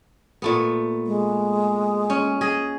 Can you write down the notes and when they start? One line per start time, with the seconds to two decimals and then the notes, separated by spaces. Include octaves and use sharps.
0.42 A#2 A3 B3
1.06 G#3
2.10 C#4
2.41 G#4 D#5